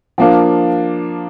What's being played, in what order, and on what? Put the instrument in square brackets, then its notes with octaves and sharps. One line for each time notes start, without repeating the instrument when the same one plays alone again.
[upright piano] F3 A#3 D4 F4